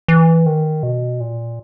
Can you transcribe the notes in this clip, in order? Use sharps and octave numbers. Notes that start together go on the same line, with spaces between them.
E3
D#3
B2
A#2